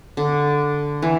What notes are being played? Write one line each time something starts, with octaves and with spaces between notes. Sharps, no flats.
D3
E3